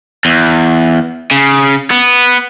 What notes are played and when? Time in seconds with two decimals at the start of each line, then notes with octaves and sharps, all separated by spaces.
0.25 E2
1.31 C#3
1.91 B3